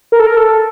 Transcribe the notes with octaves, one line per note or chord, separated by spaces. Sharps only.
A#4
A4
A#4
A4